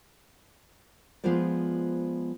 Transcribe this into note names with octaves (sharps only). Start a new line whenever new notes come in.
F3 G#3 B3 F4 C5 D5